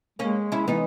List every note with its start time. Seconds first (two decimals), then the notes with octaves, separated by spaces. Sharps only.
0.19 G#3 A#3 C#4
0.52 C#4 E4
0.68 E3 B3 D#4